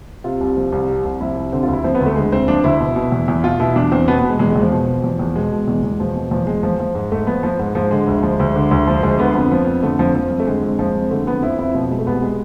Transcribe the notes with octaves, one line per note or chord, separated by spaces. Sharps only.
C3 F4
C2
F3
C2
C3
C2
F3 E4
C2
D3 C4
D2 F4
E4
F3 C4
B3
D2
A3
D3 G#3
D2 C4
F3 D4
D2 E4
B2
B2
E2
E2
B2 F4
B2 E4
E2 D4
E2 C4
B2 B3
B2 B3
G#3
E2 G#3
G#3
E2
F3
B2
B2
E2
E2
B2 G#3
B2
E2
E2
B2 F3
B2
E2 F3
E2 G#3
F3
F3
G#2
G#2 A3
F3 B3
F3
G#2
G#2 F3
D3 G#3
D2
F3
D2
D3
D2
F3
D2 G#3
D3 B3
F2
F3
F2
D3 A3
F2 F3
F3
F2
A3
D3 G#3
F2
F3
F2
D3 A3
F2 B3
F3 E4
F2 E4
B2 F3
B2 G#3
A3
C2 B3
G#3